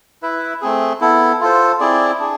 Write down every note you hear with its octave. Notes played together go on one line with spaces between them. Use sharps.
E4 B4 E5
A3 C4 G#4
B3 E4 A4
F4 A4 C5
C4 E4 G#4 D5
D4 G#4